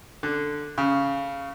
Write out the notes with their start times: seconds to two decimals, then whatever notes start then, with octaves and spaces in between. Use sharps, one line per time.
0.23 D3
0.78 C#3